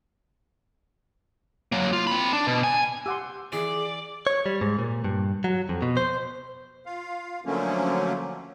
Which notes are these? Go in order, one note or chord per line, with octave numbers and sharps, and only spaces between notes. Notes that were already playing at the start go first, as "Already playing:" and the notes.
F#3 A#3
F4
C4 B5
D4
B2
G#5
G4 F#5 C6 D6 E6
E3 G#4 D5
C#5
G3
G#2
A#2
G2
F#3
F2
B2
C5
F4 F5
D3 F3 F#3 A3 A#3 C#4